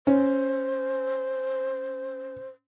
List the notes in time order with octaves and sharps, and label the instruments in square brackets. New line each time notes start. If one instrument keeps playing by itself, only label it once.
[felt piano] C#4 [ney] C5